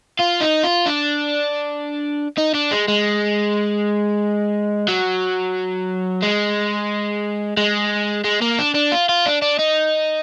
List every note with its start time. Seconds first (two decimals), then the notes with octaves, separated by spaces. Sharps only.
0.20 F4
0.41 D#4
0.64 F4
0.86 D4
2.38 D#4
2.54 D4
2.71 G#3
2.88 G#3
4.89 F#3
6.23 G#3
7.57 G#3
8.24 G#3
8.41 A#3
8.59 D4
8.75 D4
8.92 F4
9.09 F4
9.26 D4
9.42 D4
9.59 D#4